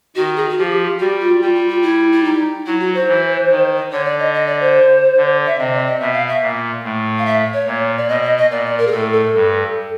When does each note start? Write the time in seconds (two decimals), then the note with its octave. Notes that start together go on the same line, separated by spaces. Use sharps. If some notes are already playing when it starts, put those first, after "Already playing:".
0.16 D#3 F#4
0.36 G#4
0.49 F#4
0.58 F3 G4
0.99 G3 F#4
1.20 F4
1.41 G3 F4
1.55 F4
1.69 F4
1.82 E4
2.12 E4
2.24 D#4
2.66 F#3 E4
2.80 F#4
2.94 C5
3.08 E3
3.50 D#3
3.91 D3 C#5
4.05 D5
4.19 D#5
4.34 D#5
4.47 D5
4.61 C5
5.17 D3
5.46 E5
5.58 C3 D#5
5.73 D5
5.87 D#5
6.00 B2 E5
6.14 F5
6.28 E5
6.42 A#2
6.83 A2
7.19 F5
7.26 E5
7.53 C#5
7.67 A#2
7.97 D5
8.09 B2 D#5
8.23 D#5
8.37 D#5
8.50 A#2 D5
8.65 D5
8.78 A#4
8.87 G#4
8.92 A2 A4
9.13 A4
9.34 G2